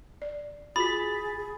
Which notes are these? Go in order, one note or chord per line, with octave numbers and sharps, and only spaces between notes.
D5
F4 F#4 G#4 B5 A6 B6